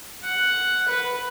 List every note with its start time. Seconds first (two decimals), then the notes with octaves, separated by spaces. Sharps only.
0.24 F#5
0.88 B4